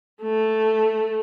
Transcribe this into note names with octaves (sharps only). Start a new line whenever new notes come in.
A3